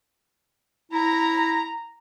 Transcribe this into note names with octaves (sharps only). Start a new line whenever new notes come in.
E4 A#5